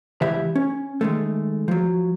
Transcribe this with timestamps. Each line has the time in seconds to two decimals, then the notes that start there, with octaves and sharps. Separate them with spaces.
0.21 C#2 E3 G4 E5 B5
0.56 C#4
1.01 D#3 G#3 A3
1.68 F3 F#3